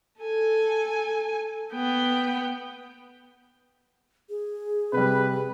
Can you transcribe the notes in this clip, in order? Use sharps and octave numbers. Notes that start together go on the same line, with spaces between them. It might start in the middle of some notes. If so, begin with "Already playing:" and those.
A4 G#5
B3 G5
G#4
C3 G3 B4